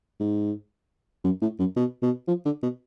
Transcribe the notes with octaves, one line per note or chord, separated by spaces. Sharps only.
G#2
F#2
A2
F#2
B2
B2
F3
D3
B2